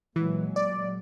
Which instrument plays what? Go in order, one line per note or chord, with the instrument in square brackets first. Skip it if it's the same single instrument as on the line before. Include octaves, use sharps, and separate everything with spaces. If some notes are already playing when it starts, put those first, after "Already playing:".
[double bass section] A#2 F#3 G#3 [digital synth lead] E3
[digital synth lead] D5